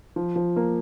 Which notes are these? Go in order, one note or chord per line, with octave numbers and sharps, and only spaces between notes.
F3
F3
A#3